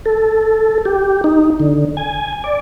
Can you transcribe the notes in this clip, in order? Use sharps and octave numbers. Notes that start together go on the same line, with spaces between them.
A4
G4
D#4
D3
G#5
D5